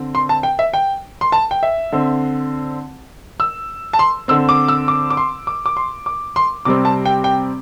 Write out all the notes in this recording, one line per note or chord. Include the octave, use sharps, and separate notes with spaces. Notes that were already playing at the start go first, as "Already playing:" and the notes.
Already playing: D3 C4
C6
A5
G5
E5
G5
C6
A5
G5
E5
D3 C4
E6
A5
C6
D3 C4 E6
D6
E6
D6
D6
C6
D6
D6
C6
D6
C6
C3 G3 C4 D6
A5
G5
G5